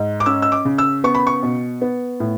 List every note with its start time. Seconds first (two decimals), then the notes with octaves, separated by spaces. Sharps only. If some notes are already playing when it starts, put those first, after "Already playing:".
Already playing: G#2
0.20 D6
0.26 C#4 E6
0.42 E6
0.52 D6
0.65 C#3
0.78 E6
1.04 B3 C#6
1.15 B5
1.27 C#6
1.43 B2
1.82 B3
2.20 A2